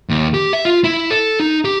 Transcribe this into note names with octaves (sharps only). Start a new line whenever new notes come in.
D#2
G4
E5
F4
E4
A4
D#4
G4